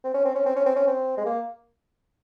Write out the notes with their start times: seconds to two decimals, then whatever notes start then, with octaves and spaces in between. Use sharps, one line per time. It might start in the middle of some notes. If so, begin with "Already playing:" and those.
0.04 C4
0.14 C#4
0.25 C4
0.35 C#4
0.46 C4
0.56 C#4
0.66 C4
0.76 C#4
0.87 C4
1.17 G#3
1.26 A#3